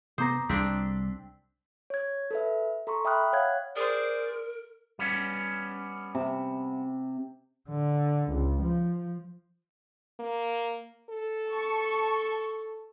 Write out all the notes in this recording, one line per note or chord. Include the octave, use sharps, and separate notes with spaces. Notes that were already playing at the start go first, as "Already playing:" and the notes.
C3 B3 C5 A#5 D6 D#6 A#6
C2 C4 D4 B6
C#5 G#6
A4 B4 E5
A4 A#5 C6 C#6
E5 G5 B5 D#6 F6 F#6
C#5 F5 F#5 F#6 G#6
G#4 A#4 C5 D5
G3 B3 C#4
C3
D3
C#2
F3
A#3
A4
A5 C#6